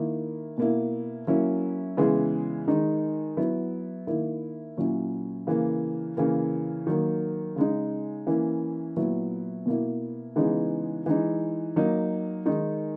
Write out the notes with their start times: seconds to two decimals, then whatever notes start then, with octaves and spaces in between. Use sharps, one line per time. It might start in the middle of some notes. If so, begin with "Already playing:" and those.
Already playing: D#3 A#3 E4
0.58 B2 A#3 E4
1.27 F#3 A#3 C#4 E4
1.97 C#3 E3 G#3 B3 E4
2.67 D#3 G#3 D#4
3.37 F#3 B3 E4
4.07 D#3 A#3 E4
4.77 A#2 F#3 C#4 E4
5.47 C#3 E3 A#3
6.17 C#3 E3 A#3
6.87 D#3 F#3 A#3
7.56 C#3 G#3 D#4
8.27 E3 A#3 C#4 E4
8.96 A#2 F#3 B3 E4
9.66 B2 A#3 E4
10.36 C#3 E3 G#3 B3 D#4
11.06 E3 G#3 D#4
11.76 F#3 A#3 D#4
12.46 D#3 G#3 D#4